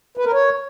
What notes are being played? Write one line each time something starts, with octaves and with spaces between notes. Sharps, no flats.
B4
A#4
C#5